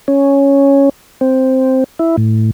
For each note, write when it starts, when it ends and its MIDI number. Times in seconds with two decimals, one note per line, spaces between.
0.08 0.89 61
1.21 1.84 60
1.99 2.16 64
2.17 2.51 45